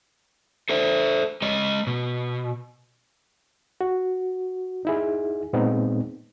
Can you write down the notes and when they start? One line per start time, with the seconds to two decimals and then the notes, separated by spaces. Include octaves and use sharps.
0.69 A4 C5 E5
1.42 G#3 C#5 D#5
1.87 B2
3.81 F#4
4.85 D#4 E4 G#4
5.53 A#2 G#3 B3 C4 D#4